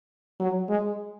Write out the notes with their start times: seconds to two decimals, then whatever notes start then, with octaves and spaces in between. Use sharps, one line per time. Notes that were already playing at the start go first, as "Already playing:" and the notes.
0.40 F#3
0.69 G#3